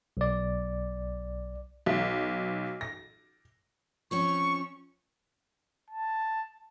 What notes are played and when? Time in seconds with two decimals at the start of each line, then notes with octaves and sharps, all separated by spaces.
0.17 B1 D5
1.86 B1
2.81 A#6
4.11 F3 C4 C#4 C#6
5.90 A5